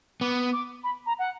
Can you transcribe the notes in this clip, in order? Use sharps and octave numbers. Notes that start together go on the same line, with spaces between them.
B3 D6
D6
B5
A#5
F#5